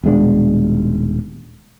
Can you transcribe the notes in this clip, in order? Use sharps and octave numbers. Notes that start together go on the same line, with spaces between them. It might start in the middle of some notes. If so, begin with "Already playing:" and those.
D#1 B2 G#3 D4